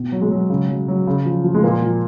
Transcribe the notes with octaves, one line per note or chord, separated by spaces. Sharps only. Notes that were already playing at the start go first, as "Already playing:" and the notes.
Already playing: B2
F#3
G#3
F#3
C#3
F#3
F#3
C#3
F3
F3
G#3
A#2 A#3
F3